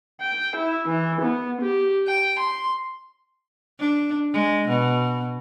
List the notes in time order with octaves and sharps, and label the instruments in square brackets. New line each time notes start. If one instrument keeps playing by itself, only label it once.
[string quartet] G5
E4
E3
B3
G4
G5
C6
[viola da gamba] D4
G#3
B2